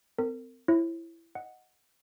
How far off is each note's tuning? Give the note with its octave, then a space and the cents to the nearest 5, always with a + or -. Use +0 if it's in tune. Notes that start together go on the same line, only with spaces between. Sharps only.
C4 -35 A#4 -40
E4 +15 C#5 -45
D#5 +0 F#5 +0